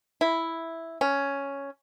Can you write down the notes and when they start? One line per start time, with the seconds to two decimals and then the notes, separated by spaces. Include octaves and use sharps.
0.21 E4
1.01 C#4